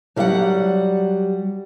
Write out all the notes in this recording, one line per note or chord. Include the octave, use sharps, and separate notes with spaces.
F#3 G3 D5 E5 F#5